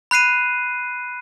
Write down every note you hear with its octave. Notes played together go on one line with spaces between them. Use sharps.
B5 F#6 C7 D#7